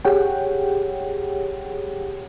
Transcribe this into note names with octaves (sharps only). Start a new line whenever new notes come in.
G4 G#4 C#5 F#5 G5